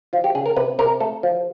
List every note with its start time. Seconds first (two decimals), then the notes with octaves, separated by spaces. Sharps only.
0.13 F3 F4
0.24 G4
0.35 C#3 G#4
0.46 A#4
0.57 C3 B4
0.79 C3 A#4
1.00 A3 A4
1.23 F3